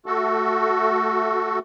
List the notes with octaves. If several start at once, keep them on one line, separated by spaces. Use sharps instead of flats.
A3 F#4 A4